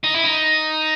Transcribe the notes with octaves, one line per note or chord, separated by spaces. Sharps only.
D#4
E4
D#4